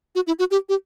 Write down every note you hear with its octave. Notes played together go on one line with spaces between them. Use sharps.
F#4
E4
F#4
G4
G4